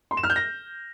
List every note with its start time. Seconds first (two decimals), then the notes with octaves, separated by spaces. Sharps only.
0.11 C6
0.17 E7
0.23 F6
0.30 G6
0.36 A#6